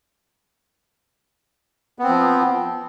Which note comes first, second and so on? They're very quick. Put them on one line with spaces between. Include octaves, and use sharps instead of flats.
B3 C4 F3